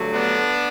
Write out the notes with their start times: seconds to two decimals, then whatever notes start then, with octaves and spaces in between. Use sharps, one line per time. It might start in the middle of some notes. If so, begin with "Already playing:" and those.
Already playing: G2 D3 F#3 A3
0.13 B3 D4